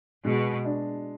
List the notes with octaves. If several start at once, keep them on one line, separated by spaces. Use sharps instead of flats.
B2 G#3
D4